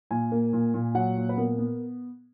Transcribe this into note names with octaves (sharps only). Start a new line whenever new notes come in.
A#2 G#5
A#3
A#2
A#2
F#3 F#5
A#2
B4
B3 A#4
B3